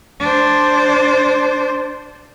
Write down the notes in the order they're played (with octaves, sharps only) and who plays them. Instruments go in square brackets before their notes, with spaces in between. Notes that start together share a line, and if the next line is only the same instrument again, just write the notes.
[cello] D4 C5